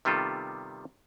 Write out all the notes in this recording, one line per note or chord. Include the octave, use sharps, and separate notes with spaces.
C3 D#3 G3 B3 F4 A4